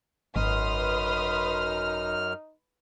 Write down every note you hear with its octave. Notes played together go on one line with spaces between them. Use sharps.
G#1 F#2 D#4 B4 C6 D#6 F6